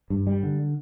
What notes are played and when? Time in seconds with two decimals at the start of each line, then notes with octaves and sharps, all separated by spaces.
0.10 G2
0.27 G3
0.43 D3